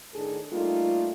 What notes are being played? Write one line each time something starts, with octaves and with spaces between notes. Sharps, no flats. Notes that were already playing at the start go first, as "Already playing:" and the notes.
A2 D#3 D4 G#4 A4
G3 A3 A#3 D#4 F4